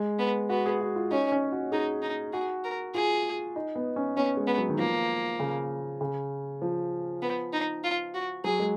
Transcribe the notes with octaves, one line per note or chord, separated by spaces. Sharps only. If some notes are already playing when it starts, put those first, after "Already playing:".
Already playing: G#3
B3
B3 F#4
G#4
F#4
F4
C#4 D#4
C#4
F#4
D#4 G#4
D#4
F#4 G#4
A#4
F4 G#4
D#4
B3
C#4
B3 C#4
G#3
B3
F#3
D#3
F3 A#3
C#3
C#3
F3
B3
D#4
F4
F#4
F#3 G#4
G#3